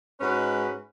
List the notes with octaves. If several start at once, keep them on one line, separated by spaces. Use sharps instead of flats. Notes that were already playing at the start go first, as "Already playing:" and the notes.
G#2 G#3 C#4 F#4 B4